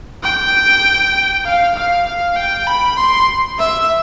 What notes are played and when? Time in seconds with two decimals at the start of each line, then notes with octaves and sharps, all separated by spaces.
0.23 G5
1.45 F5
1.75 F5
2.06 F5
2.37 G5
2.67 B5
2.98 C6
3.59 E5